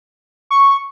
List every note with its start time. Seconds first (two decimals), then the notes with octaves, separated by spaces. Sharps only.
0.51 C#6